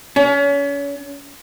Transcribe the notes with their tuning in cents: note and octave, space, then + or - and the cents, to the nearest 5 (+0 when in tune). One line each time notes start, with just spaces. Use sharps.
C#4 +35